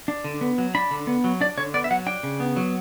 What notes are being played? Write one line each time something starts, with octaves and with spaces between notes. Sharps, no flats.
D4
D3
B3
F#3
D4 B5
D3
B3
F#3
D4 D5
D3 C#5
B3 D5
E5
F#3 F#5
D4 G5
C#3
B3
F#3